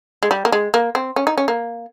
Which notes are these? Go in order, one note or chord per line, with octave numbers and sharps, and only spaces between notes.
G#3
G3
A#3
G#3
A#3
C4
C#4
D#4
C#4
A#3